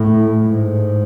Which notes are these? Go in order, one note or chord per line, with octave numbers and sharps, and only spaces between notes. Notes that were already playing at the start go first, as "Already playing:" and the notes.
Already playing: A2
G#2